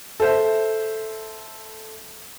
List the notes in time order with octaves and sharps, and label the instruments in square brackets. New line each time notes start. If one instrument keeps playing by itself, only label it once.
[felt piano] A4 C5 E5